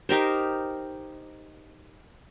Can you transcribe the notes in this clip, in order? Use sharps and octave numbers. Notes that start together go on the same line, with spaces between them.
D#4 G4 A#4 C5